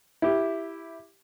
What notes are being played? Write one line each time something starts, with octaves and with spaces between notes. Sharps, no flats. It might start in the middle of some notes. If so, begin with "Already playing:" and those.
E4 G4